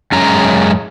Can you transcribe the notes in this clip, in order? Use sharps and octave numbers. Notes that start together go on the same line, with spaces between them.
F#2 G#3 C#4 A#5